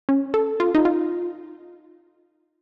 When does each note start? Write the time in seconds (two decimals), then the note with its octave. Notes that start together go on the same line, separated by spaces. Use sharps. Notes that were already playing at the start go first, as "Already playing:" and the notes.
0.09 C#4
0.34 A4
0.60 F4
0.75 D#4
0.85 F4